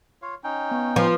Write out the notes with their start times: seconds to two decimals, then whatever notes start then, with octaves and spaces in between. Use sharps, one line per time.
0.22 F4 C#5 F5
0.44 C#4 D#4 G5
0.71 B3
0.96 F3 B4